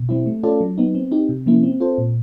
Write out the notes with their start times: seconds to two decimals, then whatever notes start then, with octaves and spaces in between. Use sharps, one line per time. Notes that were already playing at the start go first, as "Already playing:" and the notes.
Already playing: B2
0.09 G3 C4 E4
0.26 A3
0.43 C#4 F4 A4 D5
0.61 F#3
0.78 B3 D#4
0.95 C4
1.12 D#4 G4
1.29 C3
1.46 F3 A#3 C#4 E4
1.63 C4
1.80 F4 A4 C5
1.98 A#2